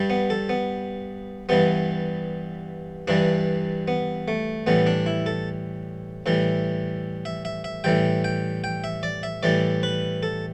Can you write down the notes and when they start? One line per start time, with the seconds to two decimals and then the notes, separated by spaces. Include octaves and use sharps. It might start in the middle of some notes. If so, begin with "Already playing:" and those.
Already playing: G2 G3
0.10 B3
0.30 A4
0.49 B3
1.49 G2 E3 G3 B3
3.08 G2 E3 G3 D4
3.88 B3
4.28 A3
4.67 A2 E3 G3 B3
4.87 D4
5.06 E4
5.26 A4
6.26 A2 E3 G3
7.25 E5
7.45 E5
7.64 E5
7.84 A2 E3 G3 G5
8.24 G5
8.64 G5
8.84 E5
9.03 D5
9.23 E5
9.43 A2 E3 G3 D5
9.83 B4
10.23 A4